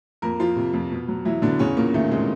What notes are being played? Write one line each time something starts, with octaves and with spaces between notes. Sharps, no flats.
F2 A#3 A#4
F3 F4
C3
F2
B2
F#3
E3 F#3 E4
B2 D3 D4
E2 C#3 C#4
E2 A#2 A#3
D#3 A3
C3 G#3